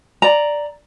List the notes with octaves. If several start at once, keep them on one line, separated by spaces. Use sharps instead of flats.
D5 A#5